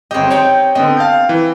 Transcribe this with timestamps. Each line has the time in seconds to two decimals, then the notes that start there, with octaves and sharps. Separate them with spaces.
0.11 G1 C4 G4 D#5
0.30 C4 D#4 C#5 G5
0.75 D3 B3 C4 D#5
0.97 F5 A5 G6
1.29 E3